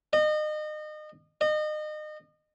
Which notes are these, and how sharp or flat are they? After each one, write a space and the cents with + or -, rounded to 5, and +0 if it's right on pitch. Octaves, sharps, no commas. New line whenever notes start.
D#5 -30
D#5 -30